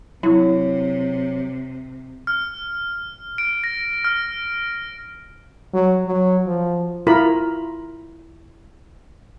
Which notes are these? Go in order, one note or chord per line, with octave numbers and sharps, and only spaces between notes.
C3 F#3 E4
F6
D7
A#6
F6
F#3
F#3
F3
E4 F4 A#4 B5